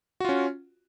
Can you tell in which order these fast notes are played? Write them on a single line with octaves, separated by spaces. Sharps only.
F#4 F4 C#4